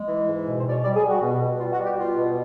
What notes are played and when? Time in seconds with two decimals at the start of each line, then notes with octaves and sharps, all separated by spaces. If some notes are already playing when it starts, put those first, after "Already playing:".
Already playing: G#3
0.08 E3
0.27 G#2
0.46 B2
0.59 C5
0.65 B2 D5
0.71 C#5
0.84 G3 D5
0.96 G#4
1.03 G3
1.09 F#4
1.22 B2
1.41 B2
1.60 G3 F4
1.73 F#4
1.79 G3
1.85 G4
1.98 B2 F4
2.18 B2